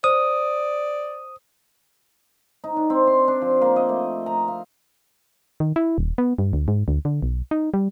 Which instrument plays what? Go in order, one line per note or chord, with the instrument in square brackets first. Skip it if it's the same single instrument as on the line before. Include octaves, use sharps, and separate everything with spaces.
[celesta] C5 [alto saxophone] D5 [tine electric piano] D#6
[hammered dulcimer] D#4
D4
C4
C6
D4
F3
A#3
D#5
A3
A#5
F5
[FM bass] D#3
E4
D#1
B3
G2
D2
G#2
D2
D3
B1
D#4
G3